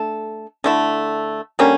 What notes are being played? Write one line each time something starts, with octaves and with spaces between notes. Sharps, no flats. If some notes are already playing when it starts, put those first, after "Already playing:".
Already playing: A3 D4 A4
D3 A3 E4
D3 G3 A#3 C#4